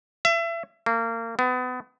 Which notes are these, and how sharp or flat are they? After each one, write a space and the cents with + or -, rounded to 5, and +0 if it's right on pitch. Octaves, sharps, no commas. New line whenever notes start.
E5 +30
A#3 -30
B3 +30